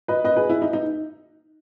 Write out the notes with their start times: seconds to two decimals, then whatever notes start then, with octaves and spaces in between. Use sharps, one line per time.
0.08 B4 D#5
0.24 B4 D#5
0.36 G#4 B4
0.50 E4
0.62 D#4
0.73 D#4